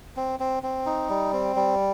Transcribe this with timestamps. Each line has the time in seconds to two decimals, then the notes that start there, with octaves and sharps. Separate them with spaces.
0.17 C4
0.40 C4
0.63 C4
0.86 D#4
1.09 G3
1.33 C4
1.56 G3